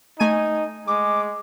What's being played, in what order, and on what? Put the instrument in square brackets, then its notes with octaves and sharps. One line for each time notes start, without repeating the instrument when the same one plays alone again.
[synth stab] A3 G#5 D#7 [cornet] D#4
[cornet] G#3 [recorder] D6